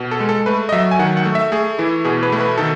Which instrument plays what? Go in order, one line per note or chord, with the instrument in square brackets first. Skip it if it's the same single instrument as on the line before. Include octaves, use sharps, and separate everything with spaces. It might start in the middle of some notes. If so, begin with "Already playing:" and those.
Already playing: [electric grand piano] B2
A4
G#3
A4
A3 B4
D#5
F#3 E5
G#5
D#3 F#5
F#5
A3
E5
A3 G#4
E3 E4
B2 G#4
B4
A3
B4
D#3 A4